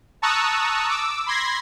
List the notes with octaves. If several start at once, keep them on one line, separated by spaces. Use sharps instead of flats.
A5 A#5 C#6 D#6 E6 F#6
D6 E6
B5 C6 G#6 A#6 C7